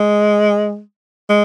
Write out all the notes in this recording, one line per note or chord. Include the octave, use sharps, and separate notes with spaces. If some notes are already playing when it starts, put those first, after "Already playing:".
Already playing: G#3
G#3